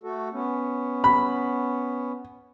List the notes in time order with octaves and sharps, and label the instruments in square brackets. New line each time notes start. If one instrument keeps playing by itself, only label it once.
[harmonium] A3 F#4 A4
B3 C#4
[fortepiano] B5